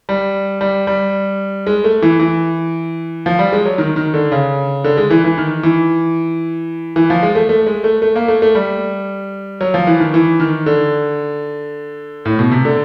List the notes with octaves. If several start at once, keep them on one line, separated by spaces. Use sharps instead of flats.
G3
G3
G3
G#3
A3
E3
E3
F3
G3
G#3
F#3
D#3
D#3
D3
C#3
D3
G#3
E3
E3
D#3
E3
E3
F3
G#3
A3
A3
G#3
A3
A3
A#3
A3
A3
G3
F#3
F3
E3
D#3
E3
D#3
D3
A2
B2
C3
D3